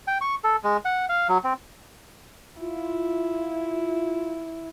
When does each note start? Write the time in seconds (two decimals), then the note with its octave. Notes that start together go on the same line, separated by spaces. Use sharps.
0.07 G5
0.21 C#6
0.44 A4
0.64 G#3
0.85 F#5
1.09 F5
1.29 F#3
1.44 C4
2.60 E4 F4